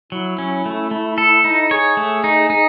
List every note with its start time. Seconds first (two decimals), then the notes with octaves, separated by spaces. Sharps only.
0.12 F#3 E4
0.38 C#4
0.66 A3
0.91 A3
1.18 A4
1.44 D#4
1.70 G#4 C#5
1.97 A3
2.24 D#4
2.50 D#4